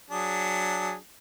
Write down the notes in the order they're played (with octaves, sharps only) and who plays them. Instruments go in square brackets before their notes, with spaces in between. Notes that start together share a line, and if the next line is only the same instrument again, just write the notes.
[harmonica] F#3 D4 G#4